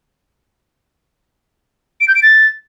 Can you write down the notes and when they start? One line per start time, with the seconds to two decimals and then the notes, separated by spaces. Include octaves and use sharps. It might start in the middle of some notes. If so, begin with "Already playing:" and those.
2.01 D7
2.08 G6
2.15 D7
2.23 A6